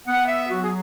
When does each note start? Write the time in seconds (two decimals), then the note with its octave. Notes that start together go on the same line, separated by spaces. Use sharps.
0.06 B3 F#5
0.28 E5
0.49 F#3 F#4
0.63 G#4